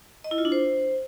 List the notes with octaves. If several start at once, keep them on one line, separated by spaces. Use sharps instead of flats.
D#5
E4
F4
D4
C5